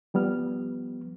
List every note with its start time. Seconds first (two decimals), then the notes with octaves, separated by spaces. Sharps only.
0.14 F3 G3 B3 F6